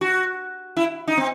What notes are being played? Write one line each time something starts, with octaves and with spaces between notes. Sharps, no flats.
F#4
E4
D#4
C4